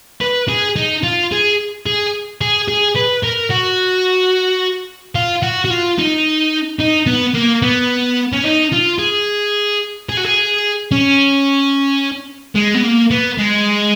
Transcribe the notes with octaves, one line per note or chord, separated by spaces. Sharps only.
B4
G#4
D#4
F4
G#4
G#4
G#4
G#4
B4
A#4
F#4
F4
F#4
F#4
F4
D#4
D#4
B3
A#3
B3
C#4
D#4
F4
G#4
G#4
F#4
G#4
C#4
G#3
B3
A#3
B3
G#3